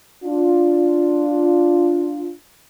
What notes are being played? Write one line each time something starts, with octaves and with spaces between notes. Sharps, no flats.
D4 F4